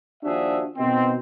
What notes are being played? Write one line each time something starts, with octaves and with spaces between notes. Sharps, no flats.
D#2 F3 D4 F#4 G#4 E5
B2 D#3 B3 C4